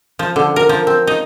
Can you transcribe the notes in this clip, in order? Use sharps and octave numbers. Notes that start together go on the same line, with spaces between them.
F3
D3
A#4
F3
C4
D#4